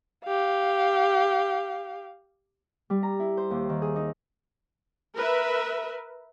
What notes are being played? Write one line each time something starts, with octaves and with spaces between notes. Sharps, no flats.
G4 F5
G3
A#5
E4
C5
D#2
D#3
G#4
D#4
A#4 B4 E5